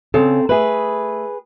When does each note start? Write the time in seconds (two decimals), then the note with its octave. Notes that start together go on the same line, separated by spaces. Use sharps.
0.14 C#3 C4 A4
0.49 A3 G#4 B4 E5